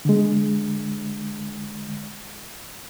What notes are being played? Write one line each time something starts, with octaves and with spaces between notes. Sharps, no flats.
D3 G#3